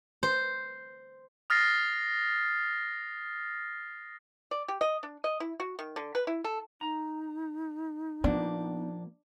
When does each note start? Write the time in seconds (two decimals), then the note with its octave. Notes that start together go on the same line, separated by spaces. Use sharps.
0.23 C5
1.50 D#6 F6 A6 A#6 C7
4.51 D5
4.68 G4
4.81 D#5
5.03 D4
5.24 D#5
5.40 E4
5.60 F#4
5.79 D#3
5.96 D3
6.15 B4
6.27 E4
6.44 A4
6.81 D#4 A#5
8.24 F3 A#3 B3 D4